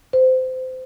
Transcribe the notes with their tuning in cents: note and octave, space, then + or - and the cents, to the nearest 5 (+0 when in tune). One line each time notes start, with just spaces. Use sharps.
C5 -25